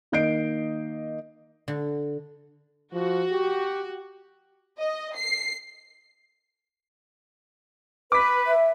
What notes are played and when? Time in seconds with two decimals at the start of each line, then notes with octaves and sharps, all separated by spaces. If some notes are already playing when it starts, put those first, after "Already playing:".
0.12 D#3 A#3 D#5 G6 C7 D7
1.68 D3
2.93 F3 F#4
3.32 G4
4.79 D#5
5.15 C7
8.12 B4 D6 B6
8.47 E5